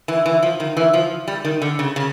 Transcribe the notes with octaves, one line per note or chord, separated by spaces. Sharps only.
E3
E3
F3
D#3
E3
F3
G3
D#3
D3
C#3
C#3